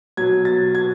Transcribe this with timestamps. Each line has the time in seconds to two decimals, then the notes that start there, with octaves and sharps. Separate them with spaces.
0.17 B2 F#3 G#6
0.45 A6
0.75 G#6